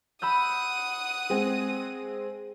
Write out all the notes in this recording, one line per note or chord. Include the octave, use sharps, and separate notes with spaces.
F#5 B5 D#6 E6 G6
G#3 C4 G#4